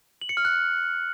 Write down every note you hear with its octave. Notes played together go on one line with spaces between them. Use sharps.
F#7
C#7
F6
F#6